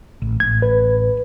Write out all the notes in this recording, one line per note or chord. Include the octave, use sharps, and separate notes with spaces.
A1
A1 G#6
B4